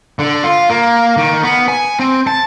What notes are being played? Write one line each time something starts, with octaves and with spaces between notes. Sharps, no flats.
D3
F4
A#3
D#3
B3
G#5
C4
A5